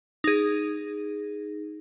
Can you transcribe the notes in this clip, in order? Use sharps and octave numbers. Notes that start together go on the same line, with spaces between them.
D#4 G#4